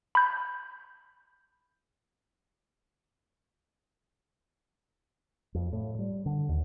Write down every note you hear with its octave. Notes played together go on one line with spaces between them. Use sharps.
B5 G6
F2
A2
G3
D3
D#2